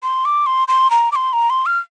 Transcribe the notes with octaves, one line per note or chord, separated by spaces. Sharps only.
C6
D6
C6
C6
A#5
D6
C6
A#5
C6
F6